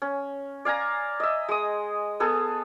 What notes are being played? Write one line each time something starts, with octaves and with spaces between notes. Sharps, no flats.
C#4
D5 F5 G#5 A#5
D#5 E5
G#3 D#6
B3 G#4 A4